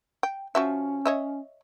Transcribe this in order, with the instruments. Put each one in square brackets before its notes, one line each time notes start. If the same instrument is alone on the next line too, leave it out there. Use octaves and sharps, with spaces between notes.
[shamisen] G5
[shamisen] F3 F#4 E5 [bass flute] C#4
[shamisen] C#5 D#5 E5